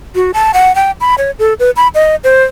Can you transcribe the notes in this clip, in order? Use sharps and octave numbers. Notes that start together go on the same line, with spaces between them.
F#4
A5
F#5
G5
B5
C#5
A4
B4
B5
D#5
C5